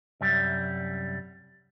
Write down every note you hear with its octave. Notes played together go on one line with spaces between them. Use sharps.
C2 F#2 G3